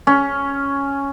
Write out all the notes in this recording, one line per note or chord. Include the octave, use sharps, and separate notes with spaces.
C#4